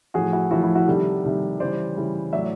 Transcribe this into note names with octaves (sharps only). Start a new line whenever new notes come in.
A2 F3 F#4 G#4
E4 F#4
A2 F3 E4 F#4
E4 F#4
E4 F#4
C3 D#3 G3 G4 A4
C3 D#3 G3
C#3 E3 G3 C5 D5
C#3 E3 G3
A2 F#3 D5 E5